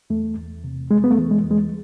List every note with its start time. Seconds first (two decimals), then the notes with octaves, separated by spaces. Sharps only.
0.10 E2 A3
0.37 E2
0.64 C3
0.91 E2 G#3
1.04 B3
1.11 A3
1.18 E3
1.31 G#3
1.44 E2
1.51 G#3